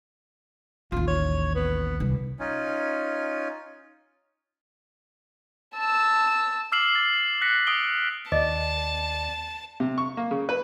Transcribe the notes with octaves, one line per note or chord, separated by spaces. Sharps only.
A1 D#2 F4
C#5
B3
C2
C#4 D#4 F4 G#5
A5 E6
D6 E6 F6 C7 E7 F#7
D6 A6
F#6 A#6 B6 C#7
D#6 D7 G7
D#2 D5 D#5 A5
C3
C#6
A#3
C#3
B4